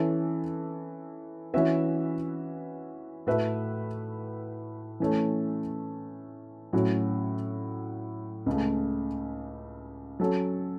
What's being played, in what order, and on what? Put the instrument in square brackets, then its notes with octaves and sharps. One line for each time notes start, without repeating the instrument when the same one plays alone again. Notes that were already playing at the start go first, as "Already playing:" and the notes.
Already playing: [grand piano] E3 C#4 A4 E5
E3 C#4 F#4 B4 E5
A2 A3 F#4 B4 E5
E3 A3 C#4 A4
A2 F#3 C#4 F#4
C#2 C#3 A3
F#3 C#4 A4